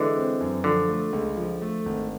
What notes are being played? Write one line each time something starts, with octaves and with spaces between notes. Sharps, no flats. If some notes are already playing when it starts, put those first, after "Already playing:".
Already playing: D3 E3 G#3
C4
F#2
D3 F3
A3
C#2
F3
A3
G#1